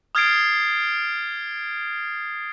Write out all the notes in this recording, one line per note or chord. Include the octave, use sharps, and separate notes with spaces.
D#6 F6 G#6 A6 C7 D7